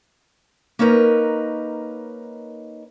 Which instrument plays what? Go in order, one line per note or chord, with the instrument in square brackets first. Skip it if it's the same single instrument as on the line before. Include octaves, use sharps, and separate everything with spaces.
[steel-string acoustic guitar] A#3 C#4 D#4 A#4 B4